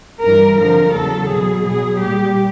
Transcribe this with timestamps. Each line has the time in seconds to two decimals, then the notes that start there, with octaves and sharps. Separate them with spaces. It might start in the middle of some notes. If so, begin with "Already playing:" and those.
0.22 G2 E3 G3 A#4
0.58 F2 D3 F3 A#4
0.94 E2 C#3 F#3 A4
1.30 B2 F#3 G#4
1.66 B2 F#3 G#4
2.01 A#2 G3 G4